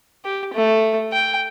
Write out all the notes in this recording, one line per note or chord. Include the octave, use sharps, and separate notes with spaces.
G4
A3
G5